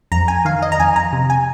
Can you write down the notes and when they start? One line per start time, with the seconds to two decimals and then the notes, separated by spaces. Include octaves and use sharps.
0.12 F2 A#5
0.28 G#5
0.45 D#3 F5
0.62 D#5
0.72 A#5
0.79 F2 G#5
0.96 A#5
1.13 C3
1.30 G#5